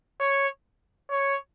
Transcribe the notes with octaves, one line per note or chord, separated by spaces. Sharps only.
C#5
C#5